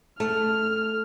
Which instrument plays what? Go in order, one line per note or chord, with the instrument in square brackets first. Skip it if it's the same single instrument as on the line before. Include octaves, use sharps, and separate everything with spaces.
[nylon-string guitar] A3 [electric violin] F6